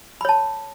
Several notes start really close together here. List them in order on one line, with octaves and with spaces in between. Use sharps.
B5 C#5 A5